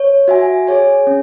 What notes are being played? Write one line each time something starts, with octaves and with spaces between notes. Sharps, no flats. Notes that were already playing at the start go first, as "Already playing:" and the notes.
Already playing: C#5
F#4 E5 G#5
G#4 C#5 G#5
C#4